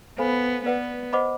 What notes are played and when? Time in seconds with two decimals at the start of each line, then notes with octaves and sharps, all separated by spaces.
0.18 B3 A4 C5 F5 G#5 B5
0.65 B3 B4 D5 F#5
1.13 C5 D#5 F#5 B5 D6